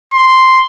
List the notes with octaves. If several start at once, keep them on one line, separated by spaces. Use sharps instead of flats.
C6